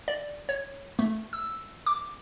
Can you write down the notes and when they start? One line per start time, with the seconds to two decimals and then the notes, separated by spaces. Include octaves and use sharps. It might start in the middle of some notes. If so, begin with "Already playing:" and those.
0.08 D5
0.49 C#5
0.99 A3
1.33 E6
1.86 D6